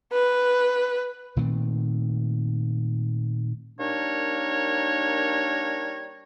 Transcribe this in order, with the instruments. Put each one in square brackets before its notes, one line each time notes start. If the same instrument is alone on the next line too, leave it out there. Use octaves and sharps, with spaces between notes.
[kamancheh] B4
[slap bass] A#2 D#3 A3 C4
[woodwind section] G3 A#3 D4 D#4 A#4 C#5